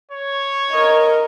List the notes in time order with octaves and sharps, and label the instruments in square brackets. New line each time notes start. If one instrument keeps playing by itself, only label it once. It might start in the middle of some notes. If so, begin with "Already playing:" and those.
[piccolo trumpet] C#5
[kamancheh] A#4 D#5